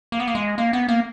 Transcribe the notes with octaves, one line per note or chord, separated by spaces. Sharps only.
A#3
B3
A#3
G#3
A#3
B3
A#3